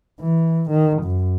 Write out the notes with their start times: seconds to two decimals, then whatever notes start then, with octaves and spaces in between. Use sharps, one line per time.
0.20 E3
0.70 D#3
1.03 F#2